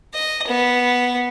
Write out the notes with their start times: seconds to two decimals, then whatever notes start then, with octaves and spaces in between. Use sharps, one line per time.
0.14 D#5
0.47 B3